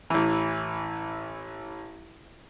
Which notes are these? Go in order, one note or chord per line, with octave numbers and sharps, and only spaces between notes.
A1 E3